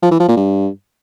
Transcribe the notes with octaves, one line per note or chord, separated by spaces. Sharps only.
F3
E3
F3
A#2
G2